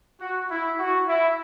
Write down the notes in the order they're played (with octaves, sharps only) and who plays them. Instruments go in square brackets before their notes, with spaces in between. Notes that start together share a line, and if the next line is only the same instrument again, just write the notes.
[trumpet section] F#4
E4
F#4
E4